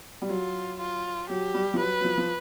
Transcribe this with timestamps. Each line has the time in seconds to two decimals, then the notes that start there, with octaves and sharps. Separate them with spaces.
0.22 G3
0.29 F#3 F4
0.79 F4
1.29 F#3 G4
1.54 G3
1.74 F3
1.80 F#3 B4
2.01 F#3
2.05 F3
2.18 F3